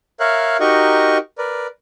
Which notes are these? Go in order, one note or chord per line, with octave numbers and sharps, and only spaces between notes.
A#4 C#5 E5 F5 F#6
D#4 F#4 G4 A#4 D#5 C#6
A#4 B4 D5